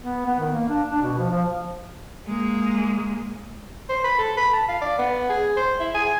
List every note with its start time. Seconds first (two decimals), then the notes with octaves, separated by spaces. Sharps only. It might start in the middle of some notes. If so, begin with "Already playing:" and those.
0.02 B3
0.26 B3
0.40 D#3
0.53 A#3
0.69 D4
0.90 D4
1.02 B2
1.18 F3
1.30 F3
2.27 G#3 A#3
3.89 C5
4.04 B5
4.19 A4
4.37 B5
4.53 A5
4.68 F5
4.81 D5
4.98 B3
5.29 G#4
5.57 C5
5.80 E4
5.94 G#5